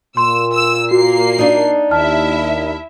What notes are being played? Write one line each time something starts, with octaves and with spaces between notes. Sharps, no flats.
A#2 C6 E6
E6
A#3 F#4 C7
D4 D#4
D#2 E4 E5 A5 F6